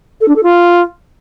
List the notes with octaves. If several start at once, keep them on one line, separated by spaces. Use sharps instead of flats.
A4
D4
A4
F4